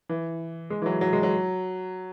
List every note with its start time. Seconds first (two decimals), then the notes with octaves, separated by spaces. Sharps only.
0.09 E3
0.70 G#3
0.82 E3
0.86 F#3
1.01 F#3
1.13 G#3
1.23 F#3